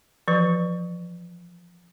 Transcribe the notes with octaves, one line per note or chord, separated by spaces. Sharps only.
E3 F3 B4